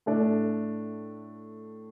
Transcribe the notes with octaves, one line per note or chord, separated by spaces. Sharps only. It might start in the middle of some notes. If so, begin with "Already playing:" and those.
A2 A3 D4